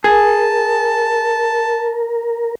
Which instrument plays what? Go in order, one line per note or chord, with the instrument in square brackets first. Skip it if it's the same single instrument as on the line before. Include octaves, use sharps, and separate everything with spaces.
[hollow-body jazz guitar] G#4 [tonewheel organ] A#4 [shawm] A5